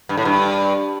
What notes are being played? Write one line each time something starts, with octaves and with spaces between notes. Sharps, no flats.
G2
A2
G2